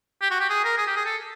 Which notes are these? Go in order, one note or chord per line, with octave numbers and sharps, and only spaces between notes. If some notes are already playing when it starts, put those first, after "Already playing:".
G4
F#4
G4
G#4
A#4
G#4
G4
G#4
A4